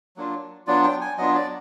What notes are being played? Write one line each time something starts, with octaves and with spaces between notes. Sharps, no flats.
F#3 A#3 D4 F4
F#3 B3 D4 F4 D5
G5
G#5
F#3 B3 D4 F4 D#5
D5